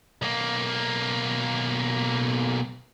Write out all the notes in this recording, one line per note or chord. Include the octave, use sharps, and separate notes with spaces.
B1 A#3